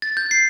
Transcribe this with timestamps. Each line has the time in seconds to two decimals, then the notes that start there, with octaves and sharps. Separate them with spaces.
0.02 A6
0.17 G6
0.31 C7